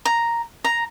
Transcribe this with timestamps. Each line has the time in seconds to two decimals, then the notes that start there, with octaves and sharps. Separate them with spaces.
0.05 A#5
0.64 A#5